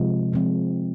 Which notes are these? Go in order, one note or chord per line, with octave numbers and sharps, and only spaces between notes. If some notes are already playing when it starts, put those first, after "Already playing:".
Already playing: C3 F3 G#3
C3 F3 G#3 C4